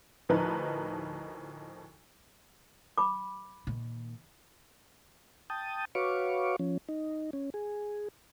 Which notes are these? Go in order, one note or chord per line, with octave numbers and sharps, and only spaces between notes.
D2 A2 F3 D#4 A#4 B4
B5 D6
A#2 D#3
G5 A5 D#6
F#4 B4 C#5 F5 C#6 D6
F3 C#4
D#4
C#4
G#4